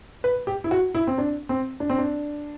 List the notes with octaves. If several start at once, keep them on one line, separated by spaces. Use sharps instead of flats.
B4
G4
E4
F#4
E4
C4
D4
C4
D4
C4
D4